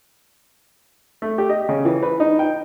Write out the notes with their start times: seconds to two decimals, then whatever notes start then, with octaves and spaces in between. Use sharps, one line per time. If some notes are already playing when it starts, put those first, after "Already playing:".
1.22 A3
1.38 G4
1.50 D#5
1.69 C#3
1.85 E3
2.03 B4
2.20 D#4
2.39 G5